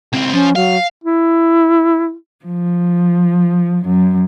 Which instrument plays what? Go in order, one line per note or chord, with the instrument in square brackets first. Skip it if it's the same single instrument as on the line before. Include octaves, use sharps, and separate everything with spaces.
[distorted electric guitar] C#2 C4
[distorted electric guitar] F3 [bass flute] C#4
[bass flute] F#3 [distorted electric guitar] F5
[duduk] E4
[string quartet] F3
F#2